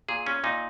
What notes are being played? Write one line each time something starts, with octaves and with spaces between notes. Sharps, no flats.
A#2 G#4
C#4
A#2 D#4